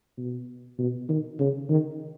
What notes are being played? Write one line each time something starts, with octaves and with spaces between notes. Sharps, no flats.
B2
B2
D#3
C#3
D#3